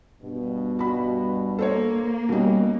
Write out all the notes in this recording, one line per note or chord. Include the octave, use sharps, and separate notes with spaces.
G2 B2
F#4 B5
A#3 A4 C5 C#5
B2 G3 C#4 D#4